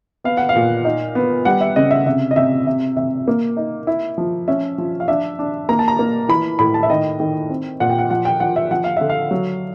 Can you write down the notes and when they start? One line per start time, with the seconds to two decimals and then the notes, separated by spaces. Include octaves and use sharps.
0.24 B3 F5
0.37 F#5
0.49 F5
0.56 A#2
0.85 D#4
1.15 B3
1.45 G3 F#5
1.61 E5
1.76 C#3 D#5
1.91 E5
2.06 C3 E5
2.31 D#5
2.36 C3 E5
2.67 C3 E5
2.97 C3 E5
3.28 A#3
3.57 D#4
3.87 E4
4.18 F3
4.48 C#4 E5
4.78 F3
5.00 F5
5.08 D4 E5
5.39 D4
5.69 A#3 A#5
5.79 A5
5.88 A#5
5.99 A#3
6.29 E3 B5
6.59 A2 B5
6.74 A5
6.83 E5
6.90 D#3 D#5
7.20 D#3
7.50 C4
7.80 A#2 F#5
7.90 G5
7.99 F#5
8.10 F3 F#5
8.25 G5
8.40 F3 F#5
8.56 E5
8.71 F3 F#5
8.84 F5
8.97 D3 E5
9.09 F5
9.31 F#3